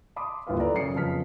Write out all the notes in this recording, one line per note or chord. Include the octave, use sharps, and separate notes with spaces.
A5 B5 C6 D6 D#6
G1 D#2 E4 F4 B4 F5
A4 B4 D5 A#5
F#2 C#3 C#4 C7 C#7
F2 C#3 B3 A5 F6 B6